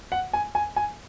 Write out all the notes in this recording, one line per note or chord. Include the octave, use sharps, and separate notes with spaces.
F#5
G#5
G#5
G#5